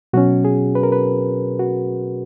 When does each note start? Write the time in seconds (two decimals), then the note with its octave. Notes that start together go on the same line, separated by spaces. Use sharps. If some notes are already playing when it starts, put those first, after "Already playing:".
0.13 B2 F#3 C#4 F#4
0.45 G#4
0.75 B4
0.83 A#4
0.92 B4
1.59 F#4